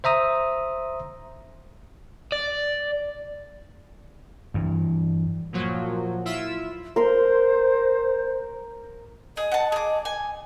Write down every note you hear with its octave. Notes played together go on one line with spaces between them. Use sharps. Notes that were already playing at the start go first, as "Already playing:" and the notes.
C5 E5 A#5 D#6
D5
G2 E3
A#2 F3 F#3
E4 F4 E5 E6
A#4 C5 C6
G#4 D#5
F#5 A5
G#4 D6
G#5